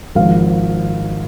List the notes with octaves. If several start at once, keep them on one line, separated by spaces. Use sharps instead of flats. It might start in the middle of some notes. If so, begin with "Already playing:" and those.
G#1 G#2 F3 F5